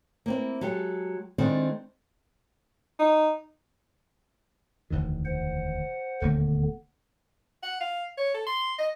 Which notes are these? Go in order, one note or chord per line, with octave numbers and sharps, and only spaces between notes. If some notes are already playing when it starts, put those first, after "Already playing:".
A#3 C4 E4
F#3 G#3 G4 A4
D#3 G#3 C4 D4 E4 A4
D#4
E1 D2 D#3
C5 F#5
D#1 D2 D3 A#3 B3
F#5
F5
C#5
A4
C6
D#5